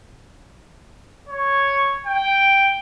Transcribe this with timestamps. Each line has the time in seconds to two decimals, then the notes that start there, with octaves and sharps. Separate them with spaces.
1.29 C#5
2.06 G5